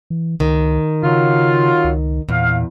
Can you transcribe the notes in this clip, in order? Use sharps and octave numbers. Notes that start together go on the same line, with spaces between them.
E3
C#2 D#3
C#3 F#3 F4
C#2
E2 A#2 F5